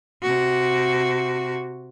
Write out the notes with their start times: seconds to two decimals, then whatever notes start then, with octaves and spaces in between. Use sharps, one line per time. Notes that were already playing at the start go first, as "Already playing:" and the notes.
0.22 C3 F#4